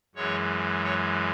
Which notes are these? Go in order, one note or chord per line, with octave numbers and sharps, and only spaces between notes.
F#2 E3 G#3 C#5
C#5